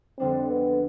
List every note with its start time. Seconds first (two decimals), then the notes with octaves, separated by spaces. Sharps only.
0.19 F2 D3 G3 C4 D4
0.50 B3